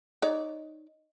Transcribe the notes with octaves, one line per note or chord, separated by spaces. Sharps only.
D#4 C#5 D5